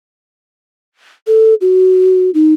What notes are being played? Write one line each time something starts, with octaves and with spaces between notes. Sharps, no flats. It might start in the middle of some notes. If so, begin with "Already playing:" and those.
A4
F#4
D#4